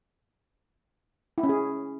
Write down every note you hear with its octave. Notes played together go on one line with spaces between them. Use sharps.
E4
C#4
G#4